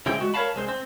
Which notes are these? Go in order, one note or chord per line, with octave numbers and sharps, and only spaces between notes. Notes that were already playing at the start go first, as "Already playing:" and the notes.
C#3 E3 G#3 C4 G5
G#3 F#4
A#4 C#5 E5 F5 A5 B5
C2 G#3 C4 C5
C4